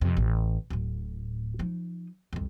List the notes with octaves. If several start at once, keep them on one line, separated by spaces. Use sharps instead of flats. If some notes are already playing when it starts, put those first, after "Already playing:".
F2 C3
A1
D1 A2
F3 D#4
C2 F2